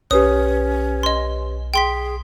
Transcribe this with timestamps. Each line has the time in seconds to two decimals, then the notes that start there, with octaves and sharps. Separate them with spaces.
0.11 B1 C#4 G4 B4 C#5 D#6
1.03 D#5 C6
1.74 G#4 G5 C6 B6